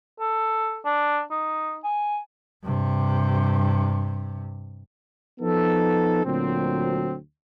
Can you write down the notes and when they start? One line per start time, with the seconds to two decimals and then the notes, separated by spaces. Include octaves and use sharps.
0.20 A4
0.85 D4
1.31 D#4
1.84 G#5
2.63 G2 C3
5.40 F3 B3 D#4 A4
6.25 D2 A#2 F#3 C4